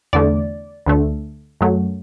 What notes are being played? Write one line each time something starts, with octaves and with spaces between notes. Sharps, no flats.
E2 D3 A3 D5
D2 D3 A3
F#2 F#3 A3